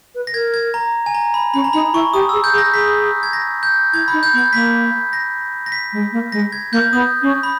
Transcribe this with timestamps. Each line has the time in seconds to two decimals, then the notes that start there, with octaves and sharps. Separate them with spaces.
0.15 B4
0.27 A#6
0.34 A#4 G#6
0.54 G#6
0.74 A#5
1.06 G#5
1.14 A#5
1.34 B5
1.54 C#4 B5
1.64 A#5
1.73 D#4 B5
1.93 E4 C#6
2.13 G4 D#6
2.29 G#4 E6
2.44 G6
2.53 G#4
2.58 A#6
2.74 G#4 B6
3.23 G#6
3.33 A#6
3.63 G6
3.93 E4 G#6
4.08 B5
4.13 D#4
4.23 G6
4.33 B3
4.38 G#6
4.53 A#3 B6
5.13 A#6
5.66 A#6
5.72 B6
5.93 G#3
6.12 A#3
6.32 G#3 A#6
6.52 G#6
6.72 A#3 G6
6.92 B3 D#6
7.22 C#4
7.43 B5